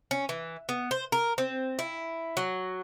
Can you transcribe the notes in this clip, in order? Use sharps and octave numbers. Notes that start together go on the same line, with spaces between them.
C#4
E3
B3
C5
A#4
C4
E4
F#3